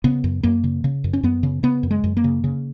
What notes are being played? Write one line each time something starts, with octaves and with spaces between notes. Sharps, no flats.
C#3 B3
F#2
F#2 A#3
C#3
C#3
F#2
C#4
F#2 B3
C#3
C#3 B3
F#2
G#3
F#2
A#3
C#3
C#3